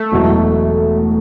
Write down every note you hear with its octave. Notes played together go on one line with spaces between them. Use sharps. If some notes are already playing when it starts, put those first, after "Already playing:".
Already playing: A3
E1 E2 B2 F#3